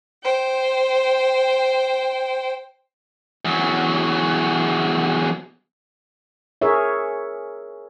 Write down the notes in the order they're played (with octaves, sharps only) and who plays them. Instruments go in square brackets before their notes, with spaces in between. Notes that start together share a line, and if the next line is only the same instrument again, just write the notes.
[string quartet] C5 G5
[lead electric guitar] E2 F#3
[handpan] G#4 A#4 C#5 E5